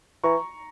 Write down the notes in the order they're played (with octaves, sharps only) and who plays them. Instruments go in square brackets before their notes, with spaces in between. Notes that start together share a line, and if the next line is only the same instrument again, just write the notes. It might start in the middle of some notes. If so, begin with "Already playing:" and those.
[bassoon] E3 [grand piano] A#5 C#6